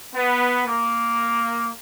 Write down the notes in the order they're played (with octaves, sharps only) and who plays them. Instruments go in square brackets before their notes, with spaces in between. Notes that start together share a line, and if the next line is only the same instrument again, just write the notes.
[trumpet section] B3
A#3